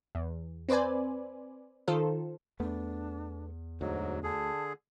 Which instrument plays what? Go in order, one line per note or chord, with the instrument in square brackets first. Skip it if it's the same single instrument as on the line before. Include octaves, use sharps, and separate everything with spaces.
[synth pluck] E2
C4 B4 C5 D5 G#5
D#3 F4 A4 C5
[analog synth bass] E2 [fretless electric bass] A3 B3 [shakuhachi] D4
[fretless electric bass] D2 [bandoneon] G#2 F#3 [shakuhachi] D#5
[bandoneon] D3 G#4 [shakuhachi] A5